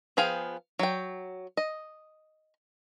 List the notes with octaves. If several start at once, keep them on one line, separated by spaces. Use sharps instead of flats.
F3 B3 G#4 F5 G5
F#3 G5
D#5